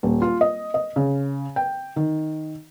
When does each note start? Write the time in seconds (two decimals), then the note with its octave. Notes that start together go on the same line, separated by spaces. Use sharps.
0.03 D#1
0.22 F4
0.41 D#5
0.74 D#5
0.96 C#3
1.56 G5
1.96 D#3